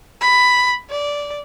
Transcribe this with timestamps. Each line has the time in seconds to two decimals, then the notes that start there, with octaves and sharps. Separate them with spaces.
0.21 B5
0.90 D5